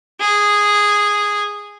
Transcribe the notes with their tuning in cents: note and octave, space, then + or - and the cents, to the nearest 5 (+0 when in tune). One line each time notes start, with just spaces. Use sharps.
G#4 -10